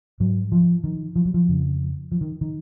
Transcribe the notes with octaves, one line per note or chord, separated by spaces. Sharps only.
G#2 F#3
F3
D#3
F3
F#3
F3
F2 C#3
F3
D#3
D#3